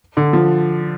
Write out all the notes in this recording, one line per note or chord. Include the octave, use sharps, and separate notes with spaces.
D3
F3